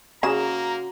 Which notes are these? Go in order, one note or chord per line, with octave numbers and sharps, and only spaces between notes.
C#3 A#3 F#4 G#4 A#5 E7